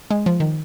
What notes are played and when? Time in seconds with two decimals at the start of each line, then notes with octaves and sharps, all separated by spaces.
0.11 G#3
0.26 F3
0.40 D#3